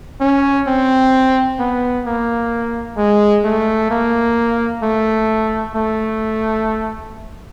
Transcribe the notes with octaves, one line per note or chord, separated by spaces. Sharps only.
C#4
C4
B3
A#3
G#3
A3
A#3
A3
A3